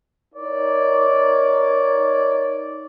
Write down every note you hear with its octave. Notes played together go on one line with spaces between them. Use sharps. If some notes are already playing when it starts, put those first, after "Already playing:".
D#4 A#4 C#5 D5